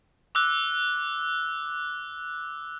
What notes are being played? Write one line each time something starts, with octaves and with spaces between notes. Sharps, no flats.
D6 E6 F#6